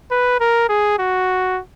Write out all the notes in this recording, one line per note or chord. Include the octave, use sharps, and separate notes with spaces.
B4
A#4
G#4
F#4